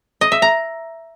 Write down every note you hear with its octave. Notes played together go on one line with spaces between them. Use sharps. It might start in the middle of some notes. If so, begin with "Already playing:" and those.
D#5
E5
A#5